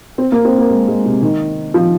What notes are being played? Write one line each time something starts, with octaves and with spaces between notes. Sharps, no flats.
C4
A#3
C4
A#3
G#3
G#3
C3
D#3
F3